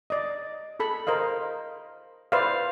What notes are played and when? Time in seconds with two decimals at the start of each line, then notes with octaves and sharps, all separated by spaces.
0.10 D5 D#5
0.80 G#4 A4 B5
1.07 A#4 C5 D#5 F5
2.32 B4 C5 D5 E5 F5